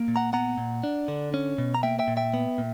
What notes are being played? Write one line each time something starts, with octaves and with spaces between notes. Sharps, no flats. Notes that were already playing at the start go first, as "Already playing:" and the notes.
Already playing: A#3
A#2
F#5 A#5
B3 F#5 A#5
A#2
D4
D3
C#4
B2
A#5
A#3 E5 G5
E5 G5
A#2
E5 G5
B3
A#2